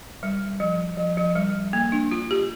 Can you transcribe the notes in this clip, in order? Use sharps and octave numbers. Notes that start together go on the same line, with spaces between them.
G3
F3
F3
F3
G3
A#3
D4
F4
G4